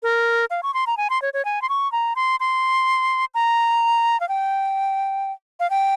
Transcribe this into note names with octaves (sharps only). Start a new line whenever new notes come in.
A#4
F5
C#6
C6
A#5
G#5
C6
C#5
C#5
G#5
C6
C#6
A#5
C6
C6
A#5
F5
G5
F5
G5